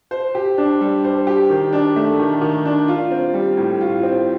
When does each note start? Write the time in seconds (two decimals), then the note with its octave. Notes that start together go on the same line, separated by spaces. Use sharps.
0.11 C5
0.35 G4
0.58 D4
0.81 G3
1.04 C5
1.27 G4
1.50 D#3
1.73 D4
1.96 A3
2.20 D#3
2.42 D#3
2.66 D4
2.88 F4
3.11 C4
3.34 G3
3.57 A2
3.81 F4
4.03 C4